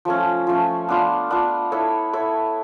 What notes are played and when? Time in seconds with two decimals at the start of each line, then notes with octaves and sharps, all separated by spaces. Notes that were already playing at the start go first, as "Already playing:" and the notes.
0.05 F3 A3 C#4
0.47 F3 A3 C#4
0.89 B3 D4 F4
1.30 B3 D4 F4
1.72 E4 A4 C#5
2.13 E4 A4 C#5